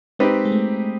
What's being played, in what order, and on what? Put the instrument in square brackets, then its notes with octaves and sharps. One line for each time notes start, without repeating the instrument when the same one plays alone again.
[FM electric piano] G#3 [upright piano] C4 D#4 G4 B4
[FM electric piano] G#3
A3